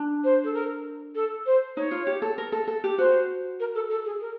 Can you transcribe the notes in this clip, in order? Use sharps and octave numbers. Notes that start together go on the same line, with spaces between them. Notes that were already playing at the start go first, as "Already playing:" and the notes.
Already playing: D4
C5
A4
A#4
A4
C5
D#4 C#5
F4
G4
A4
A#4
A4
A4
G4
F#4 C5
A#4
A4
A4
G#4
A#4